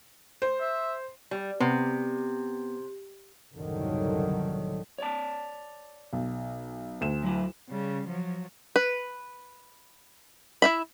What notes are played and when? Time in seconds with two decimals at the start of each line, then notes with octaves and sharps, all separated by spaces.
0.42 C5
0.60 E5
1.31 G3
1.60 C3 B3
3.55 F#1 C2 A2 D3 D#3 F#3
4.98 C#5 D5 A5
6.13 B1
7.01 D2 E7
7.23 F#3 E4
7.69 C#3 G3
8.07 F3 F#3
8.76 B4
10.62 E4 E5 B5